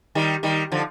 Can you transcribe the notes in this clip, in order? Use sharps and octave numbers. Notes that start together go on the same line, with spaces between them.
D#3 G3
D#3 G3
D3 F3